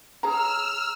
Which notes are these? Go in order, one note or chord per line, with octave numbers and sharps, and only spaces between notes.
G#4 C#5 A#5 E6 F6